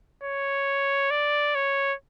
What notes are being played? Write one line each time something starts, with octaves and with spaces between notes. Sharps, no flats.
C#5
D5
C#5